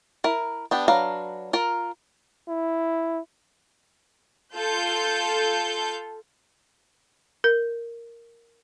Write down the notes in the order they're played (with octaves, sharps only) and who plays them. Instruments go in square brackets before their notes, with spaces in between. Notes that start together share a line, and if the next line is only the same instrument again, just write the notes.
[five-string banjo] E4 A#4
B3 D4 G4
F#3 D4 B4 F5 A#5
F4 A#4
[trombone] E4
[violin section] F4 A4 G6
[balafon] A#4